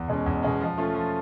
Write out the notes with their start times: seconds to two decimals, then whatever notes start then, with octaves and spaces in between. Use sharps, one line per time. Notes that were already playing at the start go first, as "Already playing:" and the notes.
Already playing: E2
0.08 B2 G#3 C#4
0.26 E2
0.43 B2 G#3 C#4
0.61 F3
0.78 A3 C#4 F4
0.95 F3